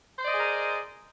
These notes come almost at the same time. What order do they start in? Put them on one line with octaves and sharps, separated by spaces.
C5 D5 D#5 G#4 A#4